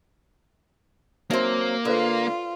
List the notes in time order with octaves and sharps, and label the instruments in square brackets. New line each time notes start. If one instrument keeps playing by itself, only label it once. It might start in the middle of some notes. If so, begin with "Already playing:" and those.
[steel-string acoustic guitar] F#3 C4 [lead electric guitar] A#3 [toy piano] D#4 E5 C6
[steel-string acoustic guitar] D3 [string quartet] F4 [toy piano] A4 B4 C5